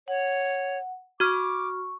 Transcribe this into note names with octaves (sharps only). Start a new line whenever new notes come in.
C#5 F#5
F#4 C#6 D6 F6